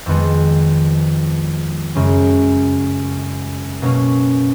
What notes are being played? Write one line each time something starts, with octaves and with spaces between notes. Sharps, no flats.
F2 D#3 G#3 B3
F#2 C#3 G#3 C#4
B2 F#3 A#3 C#4